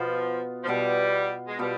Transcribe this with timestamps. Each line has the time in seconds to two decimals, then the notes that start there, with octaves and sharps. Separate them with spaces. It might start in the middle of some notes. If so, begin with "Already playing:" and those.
Already playing: B2 F3 B3 F4
0.63 F3
0.67 B2 G3 B3 F4
1.47 G#3
1.59 B2 G3 B3 F4